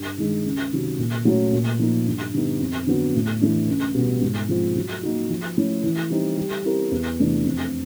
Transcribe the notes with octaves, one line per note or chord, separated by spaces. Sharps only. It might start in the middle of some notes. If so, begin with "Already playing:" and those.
Already playing: G2
D#3 G#3
C#2
C3 D#3 F#3
A#2
F#3 A3 C#4
A#2
F3 A#3 D#4
G2
D3 G3 B3 D#4
F2
D3 F#3 B3
A2
E3 A3 D4
C#2
B2 G3 B3
G#2
F3 G#3 C4 F4
F#3
A#3 D#4 F#4
F3
A3 C#4 E4
E3
G3 C4 D#4
G3
C4 E4 G4 A#4
E2
C3 E3 A3 D4
F2